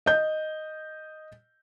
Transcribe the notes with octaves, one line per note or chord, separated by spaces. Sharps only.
D#5 G6